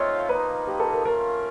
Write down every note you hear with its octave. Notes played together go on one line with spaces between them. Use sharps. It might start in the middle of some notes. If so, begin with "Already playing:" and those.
Already playing: A3 C4 F4 C#5 D#5
F3 A#3 D#4 B4
G4
A4
A#4
A3 C#4 F4 A#4